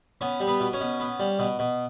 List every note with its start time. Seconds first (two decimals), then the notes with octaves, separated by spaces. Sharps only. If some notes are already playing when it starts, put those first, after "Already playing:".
0.21 B3 C#4 C#5
0.40 G3
0.47 B3 B4
0.60 B2
0.73 C#4 C#5
0.80 B2
1.00 B3
1.20 G3
1.39 B2
1.59 B2